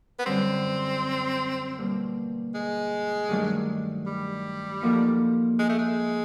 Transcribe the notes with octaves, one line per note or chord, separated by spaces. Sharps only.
B3
F#2 D3 G3 C4
B2 G3 A#3
G#3
G2 D#3 F#3 A3 D4
G3
F3 A#3 D#4 F#4 A4
G#3
A3
G#3